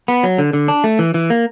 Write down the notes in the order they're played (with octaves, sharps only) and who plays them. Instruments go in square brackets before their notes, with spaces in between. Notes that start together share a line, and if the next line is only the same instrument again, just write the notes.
[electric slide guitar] B3
F#3
D3
D3
D4
A3
E3
E3
A#3